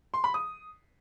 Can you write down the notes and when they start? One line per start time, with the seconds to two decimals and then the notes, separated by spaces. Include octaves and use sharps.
0.14 C6
0.24 B5
0.34 D#6